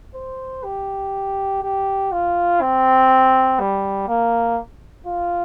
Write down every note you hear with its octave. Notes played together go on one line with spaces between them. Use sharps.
C5
G4
G4
F4
C4
G3
A#3
F4